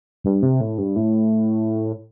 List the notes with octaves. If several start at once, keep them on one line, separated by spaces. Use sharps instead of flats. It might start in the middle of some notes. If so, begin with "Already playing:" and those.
G2
C3
A2
G2
A2